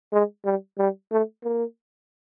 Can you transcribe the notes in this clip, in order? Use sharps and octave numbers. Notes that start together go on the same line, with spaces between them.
G#3
G3
G3
A3
A#3